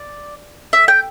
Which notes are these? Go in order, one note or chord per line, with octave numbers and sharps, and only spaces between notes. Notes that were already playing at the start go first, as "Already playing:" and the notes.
Already playing: D5
E5
G5